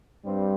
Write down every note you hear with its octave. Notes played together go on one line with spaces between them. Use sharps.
G2 G3 C4